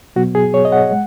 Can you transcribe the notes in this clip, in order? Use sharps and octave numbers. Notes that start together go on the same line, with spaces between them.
B2 F#3 B3 F#4
G#4
C#5
D#5
F#5
G#3